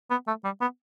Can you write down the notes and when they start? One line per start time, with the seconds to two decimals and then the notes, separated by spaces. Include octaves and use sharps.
0.11 B3
0.27 A3
0.44 G3
0.61 B3